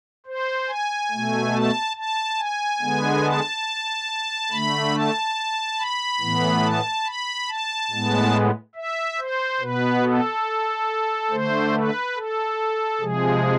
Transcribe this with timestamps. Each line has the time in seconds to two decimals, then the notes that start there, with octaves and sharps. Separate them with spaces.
0.26 C5
0.68 G#5
1.11 B2 A3
1.53 A5
1.96 A5
2.38 G#5
2.80 D3 G#3 B3
3.24 A5
4.51 D3 A3 B5
4.94 A5
5.79 B5
6.21 A2 E3 B3
6.63 A5
7.06 B5
7.48 A5
7.91 A2 G#3 B3
8.75 E5
9.18 C5
9.60 B2 B3 B4
10.03 A4
11.31 D3 A3 C5
11.74 B4
12.15 A4
13.01 C3 F3 G#3 G#4